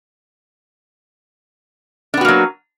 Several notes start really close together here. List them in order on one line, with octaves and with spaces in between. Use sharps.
D4 B3 F#4 A#3 F#3